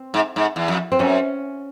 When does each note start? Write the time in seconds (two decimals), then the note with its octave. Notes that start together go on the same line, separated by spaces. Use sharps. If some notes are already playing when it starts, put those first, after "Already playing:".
Already playing: C4
0.14 G#2
0.36 G#2
0.56 E2
0.68 F2
0.92 C4
0.99 F#2 C#4